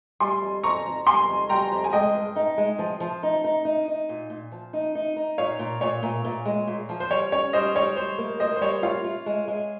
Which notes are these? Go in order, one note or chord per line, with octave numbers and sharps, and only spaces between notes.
G3 G#5 C6
F2
F2 A#5 C#6
F2
G3 G#5 C6
F2
G3 G5 A#5
F2
G#5
G#3 D#5 G5
G2
D#4
G#3
F3
F3
D#4
D#4
D#4
D#4
A#2
A#2
F3
D#4
D#4
D#4
A#2 C#5 F5
A#2
A#2 C#5
A#2
A#2
G#3
A#2
F3
C5
G3 C#5
C#4 C#5
G3 C5 D#5
G3 C#5
G3 C5
A#3
A#3 C5 D#5
C5
G3 C#5
F4 C#5 F5
F4
G#3
G#3